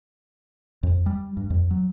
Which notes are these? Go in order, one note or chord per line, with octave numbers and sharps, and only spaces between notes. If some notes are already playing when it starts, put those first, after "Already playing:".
F2
G3
G2
F2
F#3